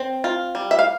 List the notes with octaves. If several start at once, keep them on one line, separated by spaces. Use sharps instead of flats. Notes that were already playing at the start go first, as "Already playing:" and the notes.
Already playing: C4
F4
G3
E5
F5